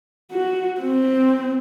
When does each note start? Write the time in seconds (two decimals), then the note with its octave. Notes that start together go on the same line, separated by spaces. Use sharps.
0.32 F#4
0.81 C4